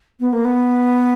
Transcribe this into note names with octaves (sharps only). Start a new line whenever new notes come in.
B3
A#3
B3